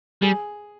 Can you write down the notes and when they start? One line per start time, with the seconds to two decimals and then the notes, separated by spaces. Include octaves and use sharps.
0.22 G3 G#4